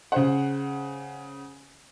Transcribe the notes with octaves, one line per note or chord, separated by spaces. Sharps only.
C#3 C5 F#5